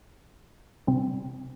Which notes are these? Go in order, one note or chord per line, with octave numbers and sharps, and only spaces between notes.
C3 G3 C4